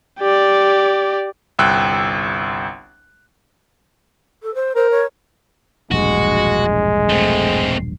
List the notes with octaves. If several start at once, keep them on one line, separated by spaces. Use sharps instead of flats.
G4 D5
G1 C2 G5 E6 F#6
A4
C5
A#4 C5
C#5
E1 A#1 G2 G#3 F#4
A3 C4